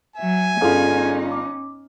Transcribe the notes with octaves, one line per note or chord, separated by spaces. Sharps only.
F#3 E5 G#5
G1 C#4 D#4 F4 G#4 A4
D6